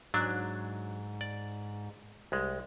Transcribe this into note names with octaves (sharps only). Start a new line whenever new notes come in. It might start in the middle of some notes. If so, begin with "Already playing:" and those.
G#2 F#3 D4
D5
C2 G#3